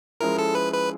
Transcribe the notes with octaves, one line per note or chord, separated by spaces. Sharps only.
F3 G#3 C#4 E4 A#4
A4
B4
B4